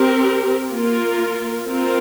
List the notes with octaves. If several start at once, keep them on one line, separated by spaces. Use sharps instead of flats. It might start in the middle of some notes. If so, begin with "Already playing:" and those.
Already playing: C4 G4 A#4
A#3 F4 A#4
C4 F4 A#4